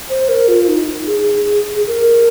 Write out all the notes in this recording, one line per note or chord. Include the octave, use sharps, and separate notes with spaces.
C5
A#4
F4
D#4
G#4
A#4